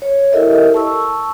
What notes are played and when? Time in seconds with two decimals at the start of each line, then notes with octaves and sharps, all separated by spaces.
0.02 C#5
0.32 E4 G4 A4 A#4 D#5 E5
0.74 A5 C#6 E6